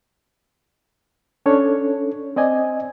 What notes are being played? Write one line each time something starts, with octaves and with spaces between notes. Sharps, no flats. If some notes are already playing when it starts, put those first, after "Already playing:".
C#4 D4 A4 C#5
C4 D5 D#5 G#5